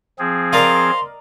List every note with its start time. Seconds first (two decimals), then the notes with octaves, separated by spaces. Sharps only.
0.19 F3 C4 G#4
0.53 A#4 D5 D#5 F5 A#5 C6